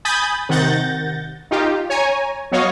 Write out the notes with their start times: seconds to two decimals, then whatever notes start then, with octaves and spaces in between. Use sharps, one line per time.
0.05 G#5 B5 D#6 G6 A6
0.49 C3 D#3 F#5 G6 A6 A#6
1.51 D#4 F4 G4
1.90 C#5 G#5 A#5
2.51 F#3 B3 F#4 C#5 D#5 F5